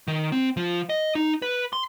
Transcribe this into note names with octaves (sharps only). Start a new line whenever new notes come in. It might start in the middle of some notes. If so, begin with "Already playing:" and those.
D#3
C4
F3
D#5
D#4
B4
C6